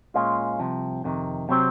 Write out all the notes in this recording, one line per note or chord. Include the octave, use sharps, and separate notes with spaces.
A#2 G#3 C#4 F4
C2 C3 F3
F2 C3 D#3
C3 F#3 C4